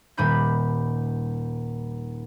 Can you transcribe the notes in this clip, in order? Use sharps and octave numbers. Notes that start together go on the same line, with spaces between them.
D#1 G3 D#4 G#5 B5 G6